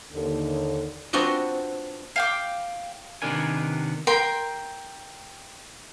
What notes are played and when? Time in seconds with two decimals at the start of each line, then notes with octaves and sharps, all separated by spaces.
0.13 D#2 D3
1.13 B3 C4 D4 F4 F#4 D#5
2.16 F5 G5 D6
3.22 C3 D#3 B3 D4 A#4 G#5
4.07 A#4 G5 C6